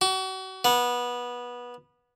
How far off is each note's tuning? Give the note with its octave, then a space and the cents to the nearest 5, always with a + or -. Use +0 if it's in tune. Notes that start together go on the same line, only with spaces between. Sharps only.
F#4 +35
B3 -20